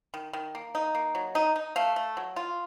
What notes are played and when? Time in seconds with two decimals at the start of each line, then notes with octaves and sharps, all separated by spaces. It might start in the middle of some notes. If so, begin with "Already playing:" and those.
0.14 D#3
0.33 D#3
0.55 A#3
0.75 D#4
0.95 A#3
1.15 F#3
1.35 D#4
1.56 D#4
1.76 A3 F5
1.96 A3
2.17 F#3
2.36 F4